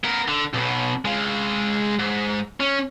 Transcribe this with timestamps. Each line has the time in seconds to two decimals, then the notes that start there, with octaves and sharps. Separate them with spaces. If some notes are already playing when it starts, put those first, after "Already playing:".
0.04 B3 A#4
0.28 D3
0.53 B1 B2
1.05 G#3 F5
1.99 G#2
2.60 C#4